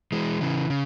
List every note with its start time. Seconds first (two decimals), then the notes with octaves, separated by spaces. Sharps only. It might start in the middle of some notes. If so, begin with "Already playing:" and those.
0.12 E3 G#3
0.41 C#3 E3
0.70 C#3